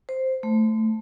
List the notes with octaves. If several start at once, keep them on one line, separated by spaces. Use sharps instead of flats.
C5
A3